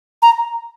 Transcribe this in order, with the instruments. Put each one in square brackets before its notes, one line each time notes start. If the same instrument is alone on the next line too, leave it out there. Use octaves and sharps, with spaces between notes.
[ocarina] A#5